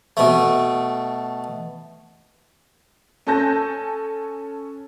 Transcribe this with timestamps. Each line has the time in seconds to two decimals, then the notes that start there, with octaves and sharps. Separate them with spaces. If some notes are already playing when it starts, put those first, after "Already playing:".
0.17 B2 A3
3.27 C#4 A4 G#5 A5 G6 A#6